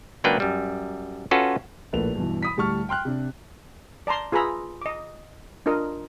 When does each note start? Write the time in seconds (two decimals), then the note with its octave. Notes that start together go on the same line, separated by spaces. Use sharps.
0.24 C#2 F#3 A#3 D4 B4 G5
0.40 F#2 G3
1.31 C#4 F4 F#4 A4 B4
1.93 A#1 A2 A#3 A4 B4 F7
2.16 G2 B2 E3
2.43 B5 D#6 B6
2.56 D2 A2 G3 A5 C#6 F6
2.89 G5 C6 F6 F#6
3.05 C3 D4
4.07 D5 A5 A#5 C6
4.32 F4 G#4 B4 A#5 B5 E6
4.82 D#5 D6
5.66 D4 F4 A#4 D#5